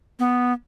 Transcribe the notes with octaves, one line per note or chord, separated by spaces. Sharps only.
B3